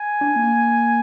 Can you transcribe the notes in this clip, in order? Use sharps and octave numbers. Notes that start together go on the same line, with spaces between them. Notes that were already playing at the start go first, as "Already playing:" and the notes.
Already playing: G#5
D4
A#3